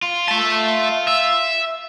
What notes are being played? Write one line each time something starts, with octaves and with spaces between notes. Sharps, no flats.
F4
E5 A5
E5